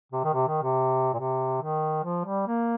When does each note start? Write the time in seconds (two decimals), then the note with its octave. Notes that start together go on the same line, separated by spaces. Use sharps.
0.12 C3
0.24 D#3
0.34 C3
0.48 D#3
0.62 C3
1.13 A#2
1.19 C3
1.62 D#3
2.04 F3
2.26 G3
2.47 A#3